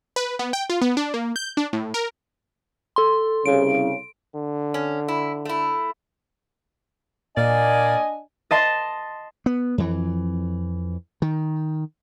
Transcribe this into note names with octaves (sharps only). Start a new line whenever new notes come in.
B4
B3
G5
F4
B3
D4
A#3
G6
D4
A2
A#4
A4 C6
C2 C#3 D7
D3
C#4
E4
A3 E4
A#2 A#3 D4 D5 D#5 G#5
D#5 A5 C6
B3
F2 E3
D#3